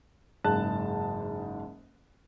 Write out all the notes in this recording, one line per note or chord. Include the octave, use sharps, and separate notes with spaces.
F#1 G#2 C#3 A5 F#6